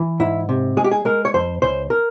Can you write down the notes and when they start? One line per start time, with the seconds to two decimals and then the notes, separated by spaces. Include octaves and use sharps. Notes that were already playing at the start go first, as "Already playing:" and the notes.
Already playing: E3
0.20 G#2 E4
0.49 C3
0.77 G#3 G#4
0.84 G4
0.91 G#4
1.05 G#3 A#4
1.25 C#5
1.34 F2 C5
1.62 C#2 C5
1.90 A#4